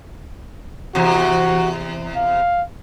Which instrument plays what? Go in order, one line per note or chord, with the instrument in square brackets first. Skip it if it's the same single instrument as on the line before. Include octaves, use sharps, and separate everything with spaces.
[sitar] E2 C3 [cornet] F#4
[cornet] F5